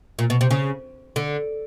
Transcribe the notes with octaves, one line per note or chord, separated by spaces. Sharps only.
A#2
B2
C3
C#3
D3